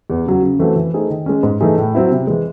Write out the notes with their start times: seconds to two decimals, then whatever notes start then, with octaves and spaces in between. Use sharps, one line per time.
0.10 E2
0.26 C#3 F#3
0.42 C#3
0.59 E3 A3 C4 F#4
0.76 E3
0.93 A3 D#4 G#4 C5
1.10 D#3
1.26 G#3 C#4
1.43 G#2
1.61 E3 A3 D#4 G#4
1.78 A2
1.94 F#3 C4 E4
2.11 C3
2.27 E3 G#3